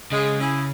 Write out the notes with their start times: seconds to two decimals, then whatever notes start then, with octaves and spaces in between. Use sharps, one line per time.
0.12 C#3 G#3
0.39 C#4 E4 G#4